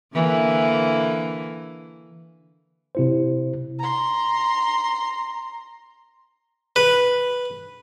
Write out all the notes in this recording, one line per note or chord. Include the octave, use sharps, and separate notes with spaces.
D3 E3 A#3
C3 E4 C5
A#5 C6
B4